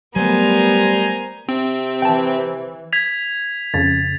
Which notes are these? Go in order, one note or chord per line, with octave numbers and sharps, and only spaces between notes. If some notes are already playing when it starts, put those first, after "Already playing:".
F#3 G3 A3 B3 A#4 C5 G#5 A#5
C3 C4
E3 G5 A5
G#6 B6 F7
F2 C#3 A6